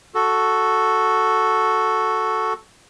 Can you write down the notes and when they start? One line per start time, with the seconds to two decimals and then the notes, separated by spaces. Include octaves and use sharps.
0.15 F#4 A4